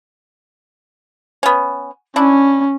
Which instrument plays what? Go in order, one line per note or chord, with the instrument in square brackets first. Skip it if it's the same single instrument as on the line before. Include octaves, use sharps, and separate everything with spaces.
[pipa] B3 C#4
[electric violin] C#4 [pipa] D4 E4